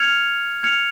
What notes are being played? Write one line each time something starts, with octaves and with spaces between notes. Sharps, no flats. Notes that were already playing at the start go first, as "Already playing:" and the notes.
Already playing: F6 G#6 C#7 F7
F6 G#6 C#7 F7